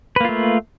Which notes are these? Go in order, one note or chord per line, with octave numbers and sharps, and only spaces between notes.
A3 A#3 F4 B4